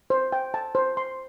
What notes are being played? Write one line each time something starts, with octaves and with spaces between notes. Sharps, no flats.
C5
G5
A5
C5
C6